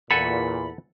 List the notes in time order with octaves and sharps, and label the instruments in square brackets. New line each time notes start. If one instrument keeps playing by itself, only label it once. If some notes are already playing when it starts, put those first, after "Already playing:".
[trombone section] E2 A#2 [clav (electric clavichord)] A4 F#5 G#5 [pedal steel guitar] B5